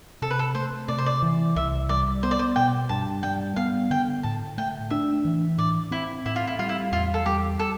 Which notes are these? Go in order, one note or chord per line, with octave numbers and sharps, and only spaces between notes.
C3 A4
B4
A4
A3 C5
C3 D5
C5
D5
E3
C2 E5
G3 D5
B3 C5
D5
C5
B2 G5
G2 A5
G3 G5
B3 F5
D3 G5
A2 A5
A3 G5
D4 E5
E3
A2 D5
C4 E4
A2 E4
F4
E4
G3 F4
E4
E2 F4
A4
G3 G4
A4